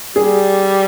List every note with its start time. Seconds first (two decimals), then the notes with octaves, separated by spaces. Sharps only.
0.16 G3 G#4